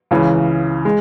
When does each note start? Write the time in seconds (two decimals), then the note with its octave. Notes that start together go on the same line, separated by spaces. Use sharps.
0.11 C#2 C#3 E3
0.85 G#3